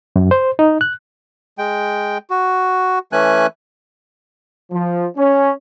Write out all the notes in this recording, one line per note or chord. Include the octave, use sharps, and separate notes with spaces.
F#2
C5
D#4
F#6
G#3 G5
F#4
E3 A3 C#4 G#5 F#6
F3
C#4